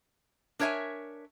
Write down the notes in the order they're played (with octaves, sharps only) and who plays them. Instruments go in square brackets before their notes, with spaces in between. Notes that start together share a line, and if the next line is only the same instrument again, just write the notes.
[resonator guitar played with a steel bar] D4 A#4 C#5 E5 G#5